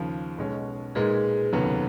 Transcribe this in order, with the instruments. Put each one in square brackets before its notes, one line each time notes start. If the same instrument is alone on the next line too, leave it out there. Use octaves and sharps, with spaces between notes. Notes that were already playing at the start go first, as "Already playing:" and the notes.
Already playing: [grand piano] D#2 C#3 F3
B1 B2 G#3 C#4
[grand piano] A#2 G#3 D#4 [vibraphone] G#4 B4
[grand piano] F1 D#2 C#3 F#3 B3